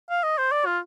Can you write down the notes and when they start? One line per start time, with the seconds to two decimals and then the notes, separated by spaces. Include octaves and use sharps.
0.10 F5
0.23 D#5
0.38 C5
0.52 D5
0.66 F4